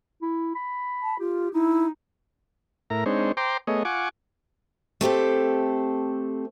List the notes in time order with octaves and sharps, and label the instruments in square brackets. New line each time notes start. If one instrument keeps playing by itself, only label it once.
[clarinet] E4
B5
[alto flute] A5
[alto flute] F4 [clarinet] G4
[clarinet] D#4 [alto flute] E4
[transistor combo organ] A2 E4 A#4 A#5
G#3 C4 D4 D#4 C5 C#5
C5 G5 A#5 C6 D6
A3 B3 G#4 C#5 D#5
F4 F#5 G#5 C#6 D6
[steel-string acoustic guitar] A3 C4 G4 A4